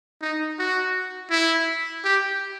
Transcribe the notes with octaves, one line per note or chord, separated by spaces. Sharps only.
D#4
F#4
E4
G4